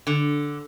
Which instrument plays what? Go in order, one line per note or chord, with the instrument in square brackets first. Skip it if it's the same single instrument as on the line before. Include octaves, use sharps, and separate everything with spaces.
[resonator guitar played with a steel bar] D3